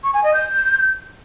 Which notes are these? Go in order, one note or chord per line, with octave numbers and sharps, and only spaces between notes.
C#6
G#5
D#5
G6